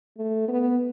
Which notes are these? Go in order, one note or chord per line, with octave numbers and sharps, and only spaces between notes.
A3
B3